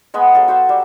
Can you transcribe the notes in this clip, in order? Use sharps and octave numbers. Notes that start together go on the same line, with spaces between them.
G#3 B3 G#5 B5
F#3 A4 F5
F#4 C5 E5
G3